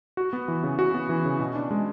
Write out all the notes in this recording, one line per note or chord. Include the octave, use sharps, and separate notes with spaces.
F#4
B3
E3
C#3
F#4
B3
E3
C#3
B2
D4
G#3